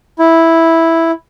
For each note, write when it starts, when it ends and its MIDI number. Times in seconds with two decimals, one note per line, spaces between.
0.19 1.11 64